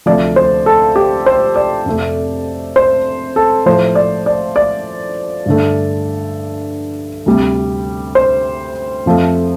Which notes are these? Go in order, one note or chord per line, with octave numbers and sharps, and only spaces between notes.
D2 C3 F3 A3 D5
C5
A4
G4
C5
D5
F2 C3 A3
C5
A4
A2 F3 A3 C5
D5
D5
D5
G2 D3 A3
D2 C3 G3
C5
F2 F3 A3